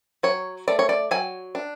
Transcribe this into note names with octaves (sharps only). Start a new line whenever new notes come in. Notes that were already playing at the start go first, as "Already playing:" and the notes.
F#3 C#5
A3 D5
C#5
D5
F#3 G#5
D4